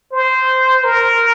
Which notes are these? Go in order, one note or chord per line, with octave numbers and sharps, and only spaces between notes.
C5
A#4